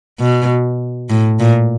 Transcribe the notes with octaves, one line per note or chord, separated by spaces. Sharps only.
B2
A2
A#2